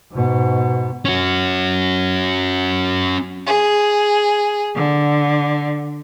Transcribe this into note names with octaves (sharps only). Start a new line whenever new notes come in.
G#2 B2
C#4 F#4
G#4
D3